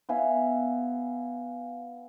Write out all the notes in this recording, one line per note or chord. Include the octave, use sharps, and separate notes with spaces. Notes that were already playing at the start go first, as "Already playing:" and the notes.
B3 E5 F5 G#5